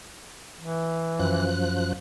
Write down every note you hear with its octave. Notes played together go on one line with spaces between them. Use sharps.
E3
F#2 F3 F#6